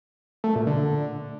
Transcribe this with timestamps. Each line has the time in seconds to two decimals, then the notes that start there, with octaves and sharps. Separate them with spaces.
0.44 A3
0.55 A#2
0.67 D3